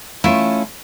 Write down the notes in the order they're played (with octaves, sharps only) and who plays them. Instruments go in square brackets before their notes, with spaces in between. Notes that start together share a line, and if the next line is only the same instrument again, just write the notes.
[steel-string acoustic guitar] A3 C#4 [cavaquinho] E4 F4